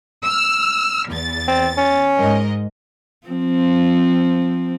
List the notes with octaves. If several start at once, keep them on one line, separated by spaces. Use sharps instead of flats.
E6 F6
E2 A6
C4
C#4
G#2 A#4 D#5
F3 C4